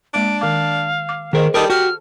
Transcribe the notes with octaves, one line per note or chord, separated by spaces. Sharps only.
G#3 A#3 D4 D6 D7
D#3 F5 D6
D6
D#3 A#3 G#4 A#4 C5 D#5
G3 A4 A#4 D#5 A5 D#6
F#4 G4 F6